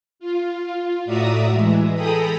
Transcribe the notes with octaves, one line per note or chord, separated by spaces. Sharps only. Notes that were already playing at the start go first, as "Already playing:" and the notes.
F4
A2 F#4 D5 E5 A#5 D#6
E3 G#3
G#4 A4 G5 A#5 B5 D#6